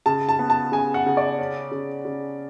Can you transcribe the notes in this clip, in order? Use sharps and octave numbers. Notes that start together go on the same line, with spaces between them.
C#3 A5
A5
B3
A5
C#3 G#5
F#5
C#3
D5
C#4
C#3
C#3